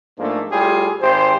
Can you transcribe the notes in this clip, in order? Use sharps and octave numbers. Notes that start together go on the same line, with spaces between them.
G#2 F3 A3 A#3 D4
A2 G3 F4 G4 G#4
G#1 G4 C5